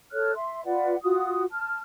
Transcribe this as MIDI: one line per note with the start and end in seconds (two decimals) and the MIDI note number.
0.12 0.32 69
0.12 0.32 73
0.12 0.32 89
0.12 0.32 90
0.35 0.64 76
0.35 0.64 84
0.64 0.95 65
0.64 0.95 71
0.64 0.95 74
0.64 0.95 78
1.02 1.43 65
1.02 1.43 66
1.02 1.43 87
1.51 1.81 81
1.51 1.81 89